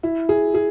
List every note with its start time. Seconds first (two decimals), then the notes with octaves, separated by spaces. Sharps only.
0.03 E4
0.29 G#4
0.54 G#4